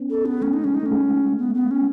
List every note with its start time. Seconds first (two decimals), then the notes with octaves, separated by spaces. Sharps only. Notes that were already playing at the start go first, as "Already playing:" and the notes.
Already playing: B3 C#4
0.10 A4
0.26 B3
0.42 A3 C#4
0.53 D#4
0.64 G#3 C#4
0.75 D#4
0.83 A3
0.86 G#3 C#4
1.38 B3
1.55 B3
1.71 C#4